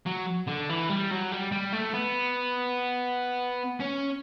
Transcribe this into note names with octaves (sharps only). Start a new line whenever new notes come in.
F#3
D3
E3
G3
F#3
G3
G3
A3
B3
C#4